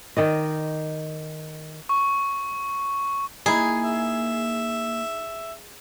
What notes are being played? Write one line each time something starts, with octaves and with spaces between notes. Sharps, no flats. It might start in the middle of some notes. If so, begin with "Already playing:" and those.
D#3 D5 D#5
C#6
A#3 D#4 E4 G#4
E5